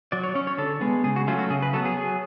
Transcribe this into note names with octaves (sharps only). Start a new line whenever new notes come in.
F#3 D5
C#5
C#4 C#5
C#5
D3 A4
G#3 B3
C#3 G#4
F#4
F#3 A3 C#4 F4
F#4
C#3 G#4
B4
F#3 B3 A4
G#4
F#3